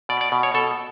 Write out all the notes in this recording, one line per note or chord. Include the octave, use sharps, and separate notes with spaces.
B2 D5
D5
B2
C#5
B2 A4